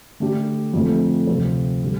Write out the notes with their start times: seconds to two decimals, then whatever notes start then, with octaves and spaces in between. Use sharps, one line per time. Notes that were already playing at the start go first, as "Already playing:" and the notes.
0.20 D3 A3 D4 G4
0.73 F2 D3 A3 C4
1.27 D2 C3 F3 C4
1.83 D3 G3